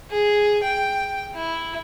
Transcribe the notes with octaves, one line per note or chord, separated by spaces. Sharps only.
G#4
G5
E4